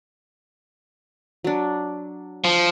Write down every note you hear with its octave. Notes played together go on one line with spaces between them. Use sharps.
F#3 D4
F3